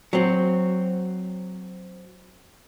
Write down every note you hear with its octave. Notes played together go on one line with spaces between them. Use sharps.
F#3 C4